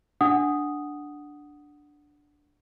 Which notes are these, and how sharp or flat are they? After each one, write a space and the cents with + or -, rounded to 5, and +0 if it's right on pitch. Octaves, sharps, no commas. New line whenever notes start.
D4 +0 F#5 +0 D#6 +0